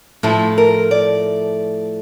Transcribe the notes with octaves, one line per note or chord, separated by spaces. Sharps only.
A2 F3 A3 E4
A#4
D5